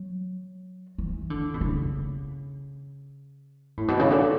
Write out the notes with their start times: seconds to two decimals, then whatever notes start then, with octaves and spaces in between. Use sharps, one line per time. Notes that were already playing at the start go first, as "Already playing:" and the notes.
Already playing: F#3
0.98 E3
1.30 D3
1.54 B2
1.61 C#3
3.77 A2
3.88 B2
3.99 C#3
4.11 D3